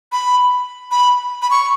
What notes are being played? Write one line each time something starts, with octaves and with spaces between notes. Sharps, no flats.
B5
B5
B5
C#6